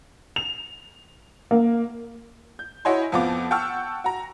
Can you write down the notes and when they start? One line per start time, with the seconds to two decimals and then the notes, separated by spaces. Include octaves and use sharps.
0.36 F7
1.51 A#3
2.59 G6
2.85 E4 F#4 C#5 D#5 G#5 C6
3.12 F2 F3 B3 F4 D6
3.51 F#5 G5 A5 C#6 E6 F6
4.04 F#4 A#5